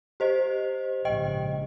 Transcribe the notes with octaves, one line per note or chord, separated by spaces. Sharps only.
G4 C5 D#5
A#1 G#2 C#3 D#5 G5